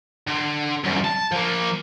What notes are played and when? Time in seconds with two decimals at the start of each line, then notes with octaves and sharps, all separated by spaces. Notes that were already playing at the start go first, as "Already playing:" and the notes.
0.27 D3
0.84 C2 F#2
1.04 A5
1.32 F3 A#3